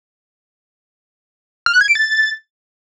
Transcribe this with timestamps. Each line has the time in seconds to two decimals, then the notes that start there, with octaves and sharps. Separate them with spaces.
1.66 F6
1.74 F#6
1.81 G#6
1.88 D7
1.95 A6